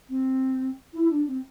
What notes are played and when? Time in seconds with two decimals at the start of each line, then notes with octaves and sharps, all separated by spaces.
0.09 C4
0.93 E4
1.09 D4
1.27 C4